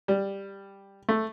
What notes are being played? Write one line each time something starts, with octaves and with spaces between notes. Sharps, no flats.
G3
A3